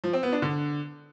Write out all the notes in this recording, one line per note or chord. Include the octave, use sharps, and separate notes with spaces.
F3
C4
B3
D4
D3